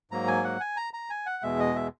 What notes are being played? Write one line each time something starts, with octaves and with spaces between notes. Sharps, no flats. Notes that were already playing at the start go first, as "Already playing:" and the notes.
G#2 F#3 A#3 A#5
G#5
F#5
G#5
A#5
A#5
G#5
F#5
E2 B2 G#3 E5
D#5
E5